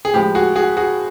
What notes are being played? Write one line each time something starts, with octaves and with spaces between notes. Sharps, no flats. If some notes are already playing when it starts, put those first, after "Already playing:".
G#4
A2 F3 G#3 G4
F#4 G#4
F#4 G#4
F#4 G#4